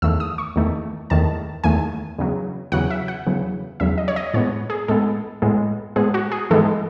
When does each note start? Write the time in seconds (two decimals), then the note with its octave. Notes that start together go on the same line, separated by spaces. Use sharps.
0.02 E2 D#3 A3 E6
0.20 D#6
0.38 C#6
0.56 E2 D#3 A3
1.10 E2 D#3 A3 A5
1.64 E2 D#3 A3 G#5
2.18 E2 C#3 F#3
2.72 E2 C#3 F#3 F#5
2.90 E5
3.08 F#5
3.26 E2 C#3 F#3
3.80 E2 C#3 F#3 E5
3.98 D#5
4.08 C#5
4.16 D#5
4.34 A2 G#3 B3 C#5
4.70 G#4
4.88 A2 G#3 B3 A4
5.42 A2 G#3 B3
5.96 A2 G#3 B3 G#4
6.14 F#4
6.32 G#4
6.50 G#2 E3 G#3 B3 A4